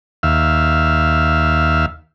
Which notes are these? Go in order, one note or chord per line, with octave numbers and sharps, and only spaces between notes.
D#2 E5 F5